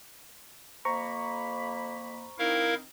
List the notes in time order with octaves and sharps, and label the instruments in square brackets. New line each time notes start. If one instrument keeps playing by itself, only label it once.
[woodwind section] F2 A#3 B5 [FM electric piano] C5 A#5 C#6
[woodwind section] D#3 C4 D#4 [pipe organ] E4 A#4 F5